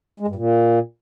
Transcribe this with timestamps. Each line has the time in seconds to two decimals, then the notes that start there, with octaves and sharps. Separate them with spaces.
0.20 G#3
0.28 G2
0.35 A#2